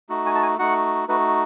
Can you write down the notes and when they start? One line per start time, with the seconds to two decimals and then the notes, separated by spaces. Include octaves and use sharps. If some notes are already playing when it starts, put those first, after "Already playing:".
0.09 A3 D#4 F#4
0.26 G#5
0.35 A5
0.43 G#5
0.59 A3 D#4 F#4 F#5
1.08 A3 D#4 F#4 B4